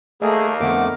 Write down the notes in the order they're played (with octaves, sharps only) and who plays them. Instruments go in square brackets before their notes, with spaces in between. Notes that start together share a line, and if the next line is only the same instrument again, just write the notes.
[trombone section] D#2 A#3 [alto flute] A3 [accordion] G#4 [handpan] D#5
[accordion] F2 A3 D6 [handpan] D3 B3 A#4 [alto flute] F#5